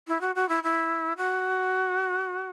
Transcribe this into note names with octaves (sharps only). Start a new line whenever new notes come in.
E4
F#4
F#4
E4
E4
F#4